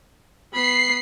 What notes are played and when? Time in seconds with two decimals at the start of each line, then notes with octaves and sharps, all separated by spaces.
0.53 B3 B5 C7